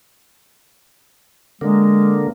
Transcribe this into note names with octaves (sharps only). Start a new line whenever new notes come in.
D3 G#3 A#3